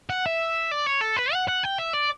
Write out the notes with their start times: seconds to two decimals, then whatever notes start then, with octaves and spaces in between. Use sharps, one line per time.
0.10 F#5
0.26 E5
0.71 D5
0.87 C#5
1.01 A4
1.17 B4
1.33 F#5
1.48 F#5
1.63 G5
1.78 E5
1.93 D5